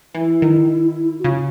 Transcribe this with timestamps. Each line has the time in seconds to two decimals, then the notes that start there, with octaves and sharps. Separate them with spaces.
0.15 E3 E4
0.42 D#3
1.19 F#4
1.24 C#3 F4